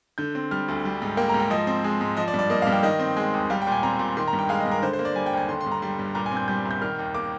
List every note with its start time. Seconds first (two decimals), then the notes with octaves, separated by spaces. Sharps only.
0.18 D3 G6
0.35 C4
0.51 G3 F6
0.68 D2
0.85 G3
1.02 G#2
1.17 A#3 G5
1.29 A#5
1.34 G#2
1.40 G5
1.50 F3 D#5
1.67 C4
1.84 G#3
2.01 G#2
2.17 F3 D#5
2.28 D5
2.34 G2
2.39 D5
2.50 A#3 D#5
2.62 F5
2.67 G2
2.72 G5
2.83 D#3 D#5
3.00 C4
3.17 G#3
3.34 D#2
3.50 G3 F5
3.62 G5
3.67 A#2 G#5
3.83 C4 A#5
3.99 A#2
4.17 D#3 C6
4.28 A#5
4.33 G2
4.39 G5
4.49 G#3 F5
4.60 D#5
4.66 G2
4.71 A#4
4.82 D3 C5
4.93 C5
4.99 A#3
5.05 D5
5.15 G3 G#5
5.26 G5
5.33 D#2 G#5
5.49 D3 C6
5.61 C6
5.66 G2
5.71 A#5
5.82 G3 C6
5.99 G2
6.15 A#2 A#5
6.26 G#5
6.32 C4
6.37 G6
6.48 G3 G6
6.65 C2
6.71 G6
6.81 D#3 F6
6.99 D#2
7.14 A#3 D6